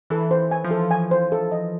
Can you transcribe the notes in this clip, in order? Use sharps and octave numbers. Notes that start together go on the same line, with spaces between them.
E3 A4
C5
G#5
F3
A4
G#5
C5
A4
D#5